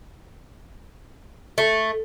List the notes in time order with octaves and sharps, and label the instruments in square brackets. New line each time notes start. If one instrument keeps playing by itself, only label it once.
[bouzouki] A3